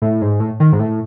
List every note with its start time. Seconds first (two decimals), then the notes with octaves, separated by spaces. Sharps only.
0.02 A2
0.21 G#2
0.40 A2
0.60 D#3
0.72 G#2
0.79 A2